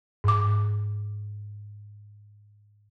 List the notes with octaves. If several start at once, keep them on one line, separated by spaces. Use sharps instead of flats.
G#2 D6